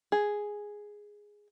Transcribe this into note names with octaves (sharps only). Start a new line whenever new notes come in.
G#4